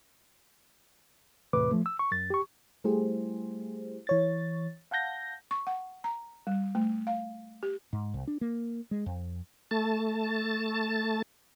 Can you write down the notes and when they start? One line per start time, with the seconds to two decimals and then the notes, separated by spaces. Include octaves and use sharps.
1.53 E2 A2 C3 B4 D6
1.72 F3 A3
1.86 E6
1.99 C#6
2.12 F#2 A6
2.30 G4 C#6
2.84 G3 A3 E4 G4 G#4 C5
4.07 E3 C#5 A6
4.91 F5 F#5 A5 G6 A#6
5.51 C#6
5.67 F#5
6.04 A#5
6.47 G3
6.75 A3
7.07 F5
7.63 G4
7.93 G#2
8.14 C2
8.27 D4
8.41 A#3
8.91 G#3
9.06 F2
9.71 A3 A5